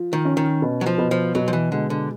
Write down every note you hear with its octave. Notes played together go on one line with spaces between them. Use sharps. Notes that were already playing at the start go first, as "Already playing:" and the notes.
Already playing: F3
D#3
C#4
D#3
B2
F#3
F3
B2
F3
B2 F#3
F3
E3
D3 G#3
D3